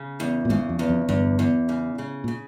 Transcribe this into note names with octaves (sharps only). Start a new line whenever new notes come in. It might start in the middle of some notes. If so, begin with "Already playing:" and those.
Already playing: C#3
E2
A#2
G#1 G#2 C#3
F2
E2
F2
G1 E2 G2
E2
C#3
C#3
A#2
C#3